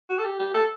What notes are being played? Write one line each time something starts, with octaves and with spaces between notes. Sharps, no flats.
F#4
A4
G4
G4
A4